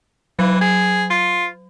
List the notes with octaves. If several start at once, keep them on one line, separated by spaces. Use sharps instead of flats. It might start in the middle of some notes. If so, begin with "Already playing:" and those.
E3 F#3
G#4
F4